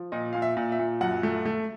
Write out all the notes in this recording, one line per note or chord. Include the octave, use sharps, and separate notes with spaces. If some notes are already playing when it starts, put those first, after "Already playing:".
Already playing: F3
A#2 D#5
A#2 F5
E5
A#2
E5
A#2
F#2 F#5
A3
A3